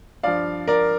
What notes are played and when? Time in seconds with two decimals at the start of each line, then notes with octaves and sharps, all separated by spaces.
0.23 G2 F3 D5 F5
0.68 A#4 D5